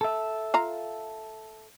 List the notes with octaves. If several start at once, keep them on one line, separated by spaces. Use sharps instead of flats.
A4 E5
F4 F5 A#5